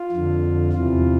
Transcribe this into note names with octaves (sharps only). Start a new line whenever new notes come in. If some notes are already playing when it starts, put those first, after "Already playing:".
Already playing: F4
F2 D3
E2 C3 E3 F4